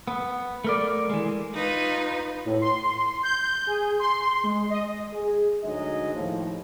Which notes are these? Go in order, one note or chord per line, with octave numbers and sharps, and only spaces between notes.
B3
A3 A#4 D5
E3 G#3
D#4 F4 B4
A2
C6
G6
G#4
C6
G#3
D#5
G#4
D2 F#3 G#3 D#4 D#5
D#2 A2 F3